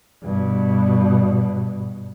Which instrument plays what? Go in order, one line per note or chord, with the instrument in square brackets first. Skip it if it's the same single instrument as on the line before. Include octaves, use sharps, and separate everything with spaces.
[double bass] G2 B2